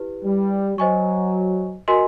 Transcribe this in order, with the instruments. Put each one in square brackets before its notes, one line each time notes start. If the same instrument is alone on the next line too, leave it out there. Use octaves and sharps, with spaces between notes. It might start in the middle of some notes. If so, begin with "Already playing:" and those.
Already playing: [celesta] E4 G4 B4
[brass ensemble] G3
[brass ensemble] F#3 [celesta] C5 D#5 G#5 C#6
[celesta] F#4 A#4 D#5 G#5 C6